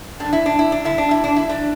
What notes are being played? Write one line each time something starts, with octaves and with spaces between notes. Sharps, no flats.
G2 D3 D4
E4
D4
E4
D4
G2 D3 E4
D4
E4
D4
E4
D3 D4